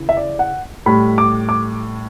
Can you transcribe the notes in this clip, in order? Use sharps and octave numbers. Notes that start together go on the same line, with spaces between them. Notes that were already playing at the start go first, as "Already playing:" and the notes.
Already playing: C#3 E3
E5
D5
F#5
A2 G3 B5
D6
D6